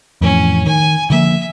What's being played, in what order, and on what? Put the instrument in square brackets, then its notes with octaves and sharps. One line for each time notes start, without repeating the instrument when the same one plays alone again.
[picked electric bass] F2 A2 E3 [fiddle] C#4
[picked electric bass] D#3 [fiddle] G#5
[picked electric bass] D3 F3 A#3 [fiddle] E5